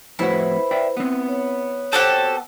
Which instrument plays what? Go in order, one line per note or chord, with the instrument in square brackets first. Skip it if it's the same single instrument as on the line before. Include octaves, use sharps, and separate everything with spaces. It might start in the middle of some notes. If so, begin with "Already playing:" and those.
[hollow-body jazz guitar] F2 A2 F#4 [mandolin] E4 [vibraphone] B4 C5
[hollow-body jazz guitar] D5 E5 G5
B3 C4
[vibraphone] C#5
[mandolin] F#4 G4 A4 [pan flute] C5